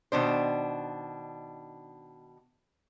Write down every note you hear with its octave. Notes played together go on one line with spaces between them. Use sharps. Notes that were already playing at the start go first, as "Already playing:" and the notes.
B2 D#3 D4 C5